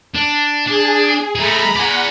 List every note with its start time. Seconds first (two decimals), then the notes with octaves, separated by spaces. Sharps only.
0.15 D4
0.67 D4 G#4
1.35 A3 G#4 A#5 B5
1.76 D5 F#5 G#5